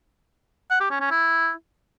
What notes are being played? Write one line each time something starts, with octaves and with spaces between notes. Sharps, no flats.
F#5
G4
C#4
C#4
E4